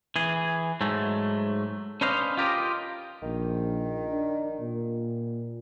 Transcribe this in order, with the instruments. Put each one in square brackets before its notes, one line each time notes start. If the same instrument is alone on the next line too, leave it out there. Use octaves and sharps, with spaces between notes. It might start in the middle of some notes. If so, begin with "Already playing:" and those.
[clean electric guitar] E3 G#4
G#2 F#3 A3
C#4 D4 B4 C5 D#5 F5
F4 G4 A#4 D#5
[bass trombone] A#1 [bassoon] D#3
[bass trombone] D4
A#2